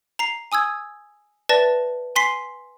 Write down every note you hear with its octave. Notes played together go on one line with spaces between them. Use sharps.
A#5 C7
G#5 D#6 E6 G#6
B4 D5 E5 A5 A6 A#6
G#5 C6 B6 C7